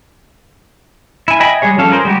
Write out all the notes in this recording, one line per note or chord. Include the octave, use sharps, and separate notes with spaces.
E4 G#5
D#5 E5 G5 G#5 B5
G3 G#3 G#4 C#5
F3 G3 C#4 A4 F5
G#4 A#4 C5
G3 G#3 F#4 G4